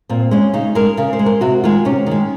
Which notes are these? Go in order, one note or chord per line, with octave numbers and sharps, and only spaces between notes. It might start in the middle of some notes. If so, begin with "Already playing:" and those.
A#2 C4
G#3 C#4
C#3 D#4
G#3 A#4
C#3 A#4
C5
G#3
A#4
C3 F#4
D#3 G#3 F4
C3 C#4
D#3 G#3